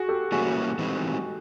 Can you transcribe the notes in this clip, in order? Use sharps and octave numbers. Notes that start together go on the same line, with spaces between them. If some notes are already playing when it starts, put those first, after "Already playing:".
Already playing: F#4 G#4
G4 A4
E3 G3 A#3 C#4 E4 F#4 G#4
E3 G#3 C4 D#4